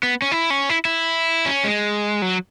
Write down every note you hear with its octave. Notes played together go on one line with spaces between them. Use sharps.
B3
C#4
E4
C#4
E4
E4
C#4
G#3
F#3